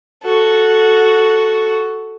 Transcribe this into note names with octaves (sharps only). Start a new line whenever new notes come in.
F#4 A4